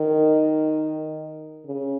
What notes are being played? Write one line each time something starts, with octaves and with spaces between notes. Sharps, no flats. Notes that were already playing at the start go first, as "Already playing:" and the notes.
Already playing: D#3
C#3